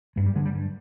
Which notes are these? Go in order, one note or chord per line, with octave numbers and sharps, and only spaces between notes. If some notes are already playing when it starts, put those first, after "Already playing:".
G2 G#3
G3
D3 G#3
G3
G2